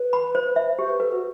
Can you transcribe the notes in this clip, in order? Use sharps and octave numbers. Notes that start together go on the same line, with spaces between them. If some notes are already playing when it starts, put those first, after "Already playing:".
Already playing: B4
B5
C5
E5
G4 C5
B4
A4 B4
F#4